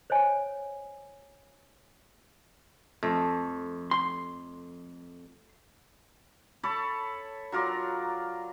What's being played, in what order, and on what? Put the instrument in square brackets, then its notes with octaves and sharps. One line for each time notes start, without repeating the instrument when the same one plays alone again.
[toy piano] C5 C#5 D#5 G#5
[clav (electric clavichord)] F2 [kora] A3
[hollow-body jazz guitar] C6
[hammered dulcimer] A4 C#5 A5 B5
F#3 F4 A#4 D5